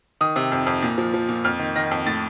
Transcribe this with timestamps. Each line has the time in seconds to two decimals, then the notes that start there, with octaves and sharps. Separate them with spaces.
0.21 D#3 D#6
0.36 C3
0.52 F2
0.67 F2
0.82 A#2
0.98 F3
1.14 F3
1.29 A#2
1.44 F2 F6
1.59 D#3
1.75 D#3 A#6
1.91 F2
2.06 A2 A6